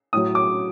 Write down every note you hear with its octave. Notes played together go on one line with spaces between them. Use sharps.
A2 F#3 D#6
D6